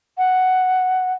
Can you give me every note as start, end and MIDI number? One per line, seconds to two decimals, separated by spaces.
0.18 1.12 78